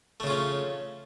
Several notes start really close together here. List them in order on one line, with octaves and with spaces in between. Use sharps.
A3 C#3 F4 C#4